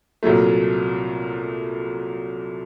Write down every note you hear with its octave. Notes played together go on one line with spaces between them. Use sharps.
C2 A#2 F#3 A3